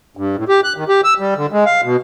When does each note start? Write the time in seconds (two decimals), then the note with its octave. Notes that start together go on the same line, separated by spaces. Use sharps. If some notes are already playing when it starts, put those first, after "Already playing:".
0.17 G2
0.36 A2
0.48 G4
0.64 F#6
0.77 D#3
0.89 G4
1.04 E6
1.20 G3
1.36 D3
1.52 G#3
1.66 F5
1.84 B2